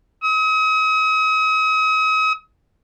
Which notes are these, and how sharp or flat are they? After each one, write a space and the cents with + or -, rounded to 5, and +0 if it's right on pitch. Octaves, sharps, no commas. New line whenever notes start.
D#6 +40